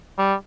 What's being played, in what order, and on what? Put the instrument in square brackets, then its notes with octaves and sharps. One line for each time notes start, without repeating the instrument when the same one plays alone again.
[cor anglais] G3